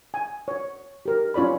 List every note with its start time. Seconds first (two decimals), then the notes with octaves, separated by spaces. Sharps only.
0.14 G#5
0.48 C#5
1.06 G4 A#4
1.34 C#4 F4 C#5 D5 B5